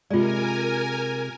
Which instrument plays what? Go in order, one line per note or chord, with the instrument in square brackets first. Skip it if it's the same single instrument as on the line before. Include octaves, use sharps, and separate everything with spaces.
[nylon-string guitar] C3 G#3 [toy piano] F4 D5 [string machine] A#4 G#5